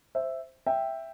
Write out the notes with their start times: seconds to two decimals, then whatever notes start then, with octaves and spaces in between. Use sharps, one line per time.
0.15 C5 E5
0.66 E5 G5